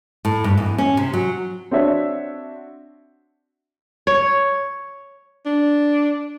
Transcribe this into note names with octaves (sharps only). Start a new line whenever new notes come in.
A2
G2
E2
C#4
C3
F#3
C4 D4 F#4 C#5 E5
C#5
D4